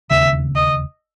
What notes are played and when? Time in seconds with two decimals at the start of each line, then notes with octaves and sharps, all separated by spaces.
0.10 E1 D#2 C#3 E5
0.55 D#5